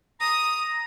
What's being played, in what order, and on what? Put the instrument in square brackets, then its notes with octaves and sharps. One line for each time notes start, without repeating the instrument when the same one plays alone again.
[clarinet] A#5 [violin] D#6